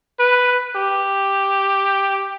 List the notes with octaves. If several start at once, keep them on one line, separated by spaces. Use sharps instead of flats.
B4
G4